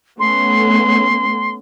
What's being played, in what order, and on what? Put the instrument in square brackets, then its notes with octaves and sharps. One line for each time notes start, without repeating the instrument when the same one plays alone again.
[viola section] A3 B3 C#4 [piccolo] C6